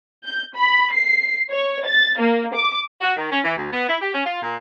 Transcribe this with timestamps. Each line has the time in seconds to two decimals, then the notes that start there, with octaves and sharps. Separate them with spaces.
0.25 G6
0.55 B5
0.93 C7
1.50 C#5
1.86 A6
2.19 A#3
2.54 D6
3.01 F#4
3.17 D#3
3.31 C#4
3.43 E3
3.57 D2
3.71 B3
3.88 E4
4.01 G4
4.13 C#4
4.26 F4
4.43 A#2